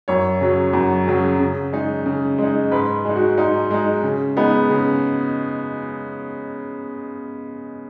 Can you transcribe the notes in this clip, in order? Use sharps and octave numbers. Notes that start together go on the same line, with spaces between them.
F#2 C#5
C#3 F#3
F#2
C#3 F#3
C#3
G#3 D#4
C#3
G#3
D#4
G#2 B4
G#3 D#4
F#4
G#2 D#4
G#3 D#4
C#3
G#3 B3 D#4
C#3